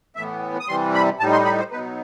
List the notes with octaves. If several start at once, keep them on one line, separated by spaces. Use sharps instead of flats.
A2 E3 B3 E5
D#6
C3 E3 G3 C6
B5
A2 G3 D#4 A5
C6
B5
C5
B2 F#3 B3 D#4 B4